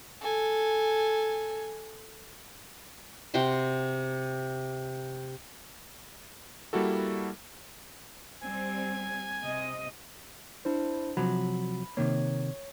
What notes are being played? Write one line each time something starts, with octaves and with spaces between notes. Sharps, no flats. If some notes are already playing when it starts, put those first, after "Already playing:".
A4 G#5
C3 F#4 G5 C6
G3 A#3 E4 F#4 A4
G3 C4 G#5
C3 D#5
D4 E4 C5
C3 F3 F#3 B5
C3 D#3 A#3 C#5